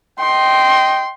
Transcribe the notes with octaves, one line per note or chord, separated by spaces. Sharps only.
D#5 G5 C6